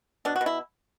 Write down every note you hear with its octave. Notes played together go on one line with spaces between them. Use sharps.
B2 D4
F#4
B2
E4